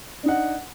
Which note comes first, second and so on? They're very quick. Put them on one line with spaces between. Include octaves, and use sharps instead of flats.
D4 D#4 F#5